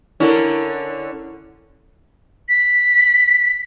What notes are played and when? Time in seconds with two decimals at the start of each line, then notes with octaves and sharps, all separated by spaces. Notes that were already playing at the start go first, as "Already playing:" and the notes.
0.20 D3 C#4 E4 A#4
2.49 B6